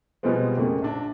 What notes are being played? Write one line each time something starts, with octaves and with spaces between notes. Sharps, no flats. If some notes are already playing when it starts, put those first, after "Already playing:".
B2 F3 G3 G#3 B3 C4
F2 C#3 A3 A#3
A#1 D4